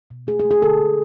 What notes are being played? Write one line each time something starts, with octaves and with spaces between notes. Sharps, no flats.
B2
A3 G#4
G#4
A3
G#4
D3 A4
D3